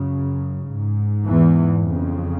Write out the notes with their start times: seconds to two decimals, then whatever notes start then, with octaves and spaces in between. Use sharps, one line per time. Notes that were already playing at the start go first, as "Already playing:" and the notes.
Already playing: F#2 C#3
0.67 G#2
1.27 E2 E3
1.88 F2 C#3